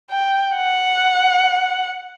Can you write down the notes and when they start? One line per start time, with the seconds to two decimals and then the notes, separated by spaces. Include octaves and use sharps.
0.11 G5
0.56 F#5